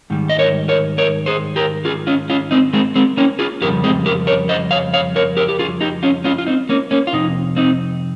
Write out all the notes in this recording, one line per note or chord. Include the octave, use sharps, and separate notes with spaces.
G#2 D#3 G3
D#5
A#4 C#5
A#4 C#5
A#4 C#5
G#4 C5
G4 A#4
F4 G#4
C#4 F4
C#4 F4
C4 D#4
G#3 C4
G#3 C4
A#3 C#4
F4 G#4
F2 C#3 G3 G4 A#4
G#3 C4
G4 A#4
A#4 C#5
C5 D#5
C#5 F5
C#5 F5
A#4 C#5
G4 A#4
G4
F4 G#4
D#4 G4
C#4 F4
C#4 F4
F4
C4 D#4
A#3 C#4
A#3 C#4
F4
F2 C3 D#4
C4 D#4